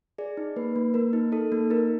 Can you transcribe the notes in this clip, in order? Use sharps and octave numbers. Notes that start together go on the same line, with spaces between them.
G#4 D5
D#4
A#3 B4
A#3
A#3 A#4
D#4
D#4 A4
A#3
D#4 A#4